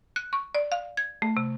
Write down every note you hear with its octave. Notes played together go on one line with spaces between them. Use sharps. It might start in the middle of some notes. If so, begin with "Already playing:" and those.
F#6
C#6
D5
F5
G#6
A3
C3